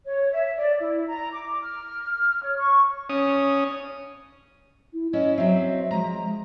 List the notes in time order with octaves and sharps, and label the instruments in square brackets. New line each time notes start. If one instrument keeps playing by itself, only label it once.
[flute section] C#5
E5
D5
E4
A#5
D6
F6
C#5
C#6
[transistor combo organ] C#4 D#6
[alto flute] E4
[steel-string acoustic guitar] C#4 E4 [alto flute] D#5
[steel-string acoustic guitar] F#3 C4 [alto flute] E5
[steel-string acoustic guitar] F3 A#5 [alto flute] G#3